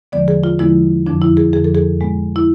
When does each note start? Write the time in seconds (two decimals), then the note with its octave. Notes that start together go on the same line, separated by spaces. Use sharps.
0.12 E2 D3 F3 G#3 B3 D5
0.28 G#4
0.44 F4
0.59 E2 D3 F3 G#3 B3 E4
1.06 F2 D3 F3 D4
1.22 E4
1.37 G#4
1.53 F2 D3 F3 G#4
1.64 A4
1.75 G#4
2.01 A2 G#3 B3
2.36 E4